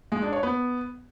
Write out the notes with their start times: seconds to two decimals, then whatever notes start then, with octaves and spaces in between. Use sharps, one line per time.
0.12 G#3
0.22 D4
0.33 C#5
0.43 B3